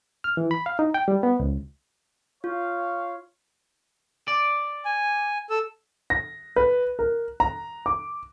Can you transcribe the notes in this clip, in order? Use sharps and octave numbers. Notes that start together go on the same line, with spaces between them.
F6
E3
B5
F5
D#4
G5
G3
B3
C#2
F4 C#5 F5
D5
G#5
A4 E6
A#6
B4
A#4
A#5
D6